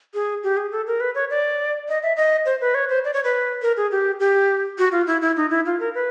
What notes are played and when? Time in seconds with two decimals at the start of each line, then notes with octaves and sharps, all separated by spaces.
0.14 G#4
0.44 G4
0.57 G#4
0.72 A4
0.87 A#4
1.00 B4
1.15 C#5
1.30 D5
1.89 D#5
2.03 E5
2.17 D#5
2.46 C5
2.61 B4
2.75 C#5
2.89 C5
3.05 D5
3.14 C#5
3.24 B4
3.62 A#4
3.77 G#4
3.91 G4
4.20 G4
4.78 F#4
4.92 F4
5.07 E4
5.22 E4
5.37 D#4
5.50 E4
5.66 F4
5.80 A#4
5.95 B4